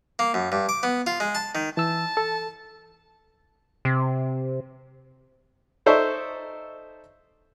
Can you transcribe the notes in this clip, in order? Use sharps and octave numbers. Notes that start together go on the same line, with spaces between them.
A#3
F#2
G2
D6
B3
F4
G#3
A5
D#3
E3 A5 E6
A4
C3
D#4 A4 C5 D5 E5 C#6